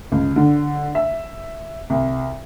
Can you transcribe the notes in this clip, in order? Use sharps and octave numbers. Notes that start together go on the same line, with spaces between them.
C#2
D3
E5
C2